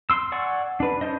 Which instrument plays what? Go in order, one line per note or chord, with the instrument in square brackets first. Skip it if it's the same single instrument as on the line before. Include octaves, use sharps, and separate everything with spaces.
[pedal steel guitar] C6 E6
D5 F#5 G#5 C#6
D4 B4
C#4 D4 C5 D#5